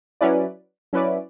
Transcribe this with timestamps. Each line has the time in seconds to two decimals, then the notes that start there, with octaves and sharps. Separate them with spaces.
0.21 F#3 C#4 E4 B4 D5
0.93 F#3 C#4 E4 B4 D5